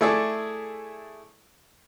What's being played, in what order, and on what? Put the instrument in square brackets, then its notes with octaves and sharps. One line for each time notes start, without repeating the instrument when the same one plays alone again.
[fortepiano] A3 E4 G#4 A4 D5